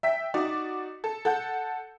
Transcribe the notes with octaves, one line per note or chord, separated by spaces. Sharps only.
E5 G5 B6
D#4 F#4 D5
A4
A4 F#5 G6